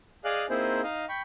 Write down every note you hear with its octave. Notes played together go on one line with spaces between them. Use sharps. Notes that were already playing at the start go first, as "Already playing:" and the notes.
G#4 D5 D#5 F5 F#6
A#3 C4 D#4 E4 G#4 C5
D#4 D#5 F5
G5 B5 C#6